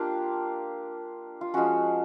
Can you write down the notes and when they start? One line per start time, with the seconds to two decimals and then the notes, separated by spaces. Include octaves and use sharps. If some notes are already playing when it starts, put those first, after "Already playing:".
Already playing: A#3 D4 F4 G4
1.41 F4
1.54 F3 G#3 C#4 F#4